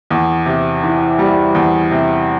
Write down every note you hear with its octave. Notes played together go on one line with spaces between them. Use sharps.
E2
C3
E3
G3
E2
C3